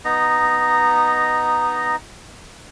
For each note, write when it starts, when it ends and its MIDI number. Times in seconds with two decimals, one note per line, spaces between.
0.05 1.96 59
0.05 1.96 63
0.05 1.96 75
0.05 1.96 82